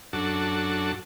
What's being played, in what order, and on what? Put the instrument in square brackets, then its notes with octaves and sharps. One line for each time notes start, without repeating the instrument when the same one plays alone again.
[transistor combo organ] F#2 D4 F#4 A4